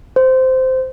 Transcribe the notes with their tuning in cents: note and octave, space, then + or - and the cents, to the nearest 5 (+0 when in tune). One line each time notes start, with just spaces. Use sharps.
C5 -10